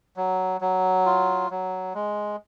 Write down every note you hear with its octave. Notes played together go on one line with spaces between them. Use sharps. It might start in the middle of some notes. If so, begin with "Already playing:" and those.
F#3
F#3
F4
F#3
G#3